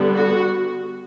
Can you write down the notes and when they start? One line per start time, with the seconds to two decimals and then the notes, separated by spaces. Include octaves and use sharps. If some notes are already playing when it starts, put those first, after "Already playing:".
Already playing: D3 G3 B3
0.16 F#4